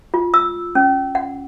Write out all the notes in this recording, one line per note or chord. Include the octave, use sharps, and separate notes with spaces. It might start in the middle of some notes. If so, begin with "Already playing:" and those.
F4
E6
C#4
F#5